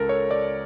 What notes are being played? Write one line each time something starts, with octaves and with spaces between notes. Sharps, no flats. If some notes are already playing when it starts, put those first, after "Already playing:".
Already playing: C#2 C#3 A4 A#4
C#5
D5